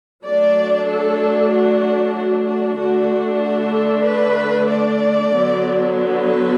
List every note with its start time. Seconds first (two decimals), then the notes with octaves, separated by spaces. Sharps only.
0.24 F#3 A3 D4 D5
0.88 A4
1.51 F#4
2.15 F#4
2.47 F#4
2.78 D3 A3 D4 F#4
3.42 F#4
3.74 A4
4.05 B4
4.69 D5
5.33 D3 F#3 B3
5.96 B4